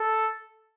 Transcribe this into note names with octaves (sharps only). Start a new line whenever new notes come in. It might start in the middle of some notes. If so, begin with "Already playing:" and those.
Already playing: A4